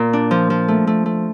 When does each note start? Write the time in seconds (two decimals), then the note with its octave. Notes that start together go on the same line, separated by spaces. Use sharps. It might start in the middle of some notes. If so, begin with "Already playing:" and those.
Already playing: A#2
0.13 D4
0.31 F3
0.50 F3
0.68 A3
0.87 A3
1.06 A3